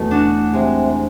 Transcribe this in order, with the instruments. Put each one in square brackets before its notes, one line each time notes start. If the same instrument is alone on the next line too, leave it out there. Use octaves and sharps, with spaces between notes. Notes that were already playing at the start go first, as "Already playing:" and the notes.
Already playing: [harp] E2 A3 [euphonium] B2
[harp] D4 F#4
[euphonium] C3 [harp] G#3